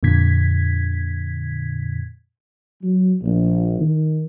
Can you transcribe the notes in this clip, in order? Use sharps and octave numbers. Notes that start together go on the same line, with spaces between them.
F2 A#2 D3 G#6 B6
F#3
A#1
D#3